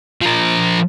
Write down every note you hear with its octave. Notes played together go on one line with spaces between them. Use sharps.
F3 A#4